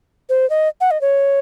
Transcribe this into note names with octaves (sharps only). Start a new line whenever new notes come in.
C5
D#5
F#5
D#5
C#5